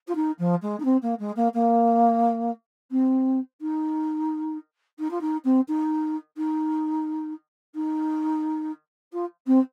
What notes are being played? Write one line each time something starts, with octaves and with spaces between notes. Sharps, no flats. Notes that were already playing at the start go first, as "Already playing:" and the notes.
F4
D#4
F3
G#3
D#4
C4
A#3
G#3
A#3
A#3
C4
D#4
D#4
F4
D#4
C4
D#4
D#4
D#4
F4
C4